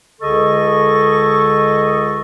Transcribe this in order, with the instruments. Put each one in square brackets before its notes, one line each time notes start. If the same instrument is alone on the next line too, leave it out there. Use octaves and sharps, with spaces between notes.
[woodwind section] C#2 D3 G#4 A4 D#5 C#6